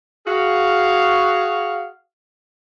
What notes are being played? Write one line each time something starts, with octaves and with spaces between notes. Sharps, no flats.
F#4 G#4 F5